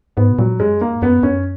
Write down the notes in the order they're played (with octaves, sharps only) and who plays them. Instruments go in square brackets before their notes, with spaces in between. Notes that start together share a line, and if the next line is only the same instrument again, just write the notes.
[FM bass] G#2 [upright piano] B3
[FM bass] B2
[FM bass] A#2 [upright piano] F#3
[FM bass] F#2 [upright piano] G#3
[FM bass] F2 [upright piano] A#3
[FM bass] G#2
[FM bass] F#2 [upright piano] B3
[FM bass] F#2 [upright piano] C#4